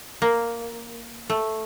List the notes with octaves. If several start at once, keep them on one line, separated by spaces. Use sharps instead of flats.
A#3
A3